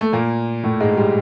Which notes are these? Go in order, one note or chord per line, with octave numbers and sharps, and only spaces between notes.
A3
A#2 A#3
A2 A3
G#2 G#3
G3